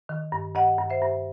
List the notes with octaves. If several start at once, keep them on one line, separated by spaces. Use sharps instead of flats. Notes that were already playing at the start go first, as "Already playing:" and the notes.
D#3
G2
G2 D#5 F#5
G2
C5 E5
G2